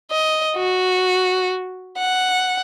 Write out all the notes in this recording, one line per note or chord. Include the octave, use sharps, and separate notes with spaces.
D#5
F#4
F#5